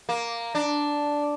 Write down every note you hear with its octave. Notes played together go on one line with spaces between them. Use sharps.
A#3
D4